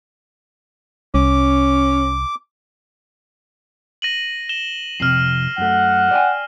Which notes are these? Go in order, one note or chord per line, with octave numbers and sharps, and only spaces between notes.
C2 C#4 D6
A#6 D#7 F#7
E7 G7
F2 A2 C3 F6 C7
F#2 A3 F#5
D5 G5 G#5